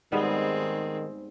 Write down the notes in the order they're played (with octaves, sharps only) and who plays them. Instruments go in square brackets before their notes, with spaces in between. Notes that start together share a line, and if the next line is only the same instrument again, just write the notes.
[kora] G#2 G3 B3 [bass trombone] D#3 [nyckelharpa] G#3 C4